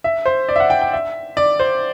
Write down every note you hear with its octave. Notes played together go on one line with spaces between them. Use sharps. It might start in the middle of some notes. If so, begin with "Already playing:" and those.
E5
C5
D5
E5
F#5
G5
G5
E5
D5
C5